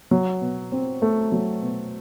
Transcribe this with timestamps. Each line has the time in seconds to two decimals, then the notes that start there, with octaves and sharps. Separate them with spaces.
0.11 F#3
0.41 B2
0.72 C4
1.02 A3
1.32 F#3
1.62 B2